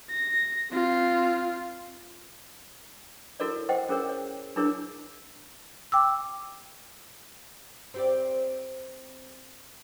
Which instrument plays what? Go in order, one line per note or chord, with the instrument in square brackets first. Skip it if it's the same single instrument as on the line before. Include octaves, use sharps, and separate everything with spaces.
[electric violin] A#6
C4 F4
[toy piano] E4 F#4 A4 A#4 C#5 D5
C5 D#5 F#5 G5
C#4 G#4 A#4 C#5
C#5
D4 E4 G#4 A#4 C#5
[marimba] G5 D6 E6
[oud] C4 G4 D5